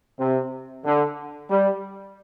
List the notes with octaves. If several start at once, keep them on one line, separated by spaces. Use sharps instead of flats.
C3
D3
G3